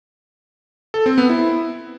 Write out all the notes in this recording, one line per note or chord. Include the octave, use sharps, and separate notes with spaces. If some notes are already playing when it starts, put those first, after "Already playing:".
A4
C4
B3
E4